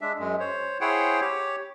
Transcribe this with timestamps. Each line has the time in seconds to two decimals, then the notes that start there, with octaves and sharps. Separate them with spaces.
0.01 G#3 D4 E5
0.19 F#2 G#3
0.40 C5 C#5
0.81 E4 G#4 C5 C#5 F#5 G5
1.21 G4 C#5